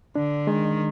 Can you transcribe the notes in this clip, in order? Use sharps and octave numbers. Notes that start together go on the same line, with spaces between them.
D3 D4
D#3 G#3